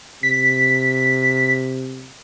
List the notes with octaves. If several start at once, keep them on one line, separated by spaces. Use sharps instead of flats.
C3 B6